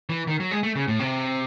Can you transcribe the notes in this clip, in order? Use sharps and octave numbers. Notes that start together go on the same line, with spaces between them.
E3
D#3
F#3
G#3
A3
C#3
A2
C3